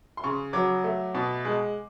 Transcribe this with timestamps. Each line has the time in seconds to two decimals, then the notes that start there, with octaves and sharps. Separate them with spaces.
0.17 C6
0.24 C#3 C#6
0.53 F#3 D6
0.84 A3
1.15 B2
1.45 G#3